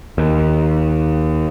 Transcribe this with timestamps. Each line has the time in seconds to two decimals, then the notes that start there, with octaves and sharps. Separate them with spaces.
0.18 D#2